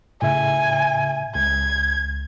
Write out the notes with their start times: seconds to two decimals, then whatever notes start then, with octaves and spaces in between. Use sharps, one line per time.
0.22 A2 C#3 E5 G#5
1.35 C#2 G#6